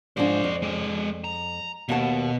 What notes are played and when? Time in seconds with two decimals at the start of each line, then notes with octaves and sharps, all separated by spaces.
0.17 G#2 F3 D4 C5 D5
0.44 F2
0.62 G#3 D5
1.24 A#5
1.89 D#2 B2 F#5 A5